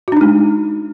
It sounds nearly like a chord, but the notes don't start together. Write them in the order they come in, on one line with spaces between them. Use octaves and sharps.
F#4 D4 D#4 G#3